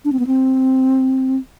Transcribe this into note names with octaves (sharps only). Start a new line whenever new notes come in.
D4
C4
B3
C4